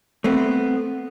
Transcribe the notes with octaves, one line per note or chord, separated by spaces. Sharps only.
A3 B3 C4